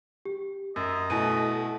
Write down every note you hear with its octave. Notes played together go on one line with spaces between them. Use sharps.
G4
F#2 D#5 E6
B2 A3 E4 G#5 D#7